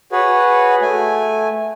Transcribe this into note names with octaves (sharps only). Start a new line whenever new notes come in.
F#4 G#4 B4 C#5
A3 G#5